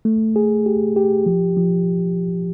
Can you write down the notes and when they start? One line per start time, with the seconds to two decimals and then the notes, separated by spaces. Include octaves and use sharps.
0.05 A3
0.36 G#4
0.66 G4
0.96 G4
1.26 F3
1.57 F3